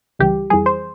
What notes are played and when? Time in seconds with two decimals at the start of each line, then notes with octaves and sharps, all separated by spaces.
0.19 C#2 C#3 E3 G3 G4
0.50 F2 E3 G3 G#4
0.66 C5